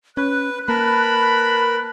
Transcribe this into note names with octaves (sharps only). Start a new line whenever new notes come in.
C#4 B4 F#6
A#3 A#4 B4 A5 B5